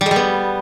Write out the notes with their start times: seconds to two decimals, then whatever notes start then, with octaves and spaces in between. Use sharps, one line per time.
0.01 G3
0.06 G#3
0.11 G3
0.16 B3